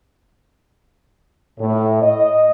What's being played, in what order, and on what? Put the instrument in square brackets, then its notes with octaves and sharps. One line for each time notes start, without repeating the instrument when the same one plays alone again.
[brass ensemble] A2
D#5